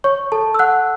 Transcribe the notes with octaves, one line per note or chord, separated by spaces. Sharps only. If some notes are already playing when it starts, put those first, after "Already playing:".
C#5 C#6
A4 A5
E6
F#5 F#6